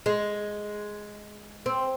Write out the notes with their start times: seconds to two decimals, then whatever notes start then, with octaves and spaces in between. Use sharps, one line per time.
0.06 G#3
1.66 C4